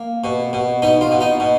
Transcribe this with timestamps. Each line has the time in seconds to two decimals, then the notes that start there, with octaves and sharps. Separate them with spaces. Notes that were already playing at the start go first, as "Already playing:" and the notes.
Already playing: A#3
0.24 B2
0.53 B2
0.82 B2 D#4
1.01 F4
1.11 B2
1.21 D#4
1.40 B2